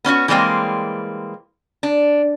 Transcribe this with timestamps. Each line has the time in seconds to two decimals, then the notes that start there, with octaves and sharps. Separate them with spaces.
0.05 B3 C#4 E4 F#4
0.28 E3 G3 G#3 A#3 C4
1.83 D4